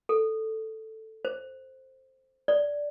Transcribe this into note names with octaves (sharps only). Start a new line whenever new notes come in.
A4
C5
D5